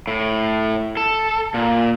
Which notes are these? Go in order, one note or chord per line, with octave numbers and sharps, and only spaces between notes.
A2
A4
A#2